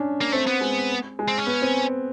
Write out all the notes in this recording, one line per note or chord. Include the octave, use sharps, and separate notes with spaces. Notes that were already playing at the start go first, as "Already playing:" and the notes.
Already playing: C#4 D4
A#3
A3 C4
B3
G#3
G#3
C4
C#4
B3
C4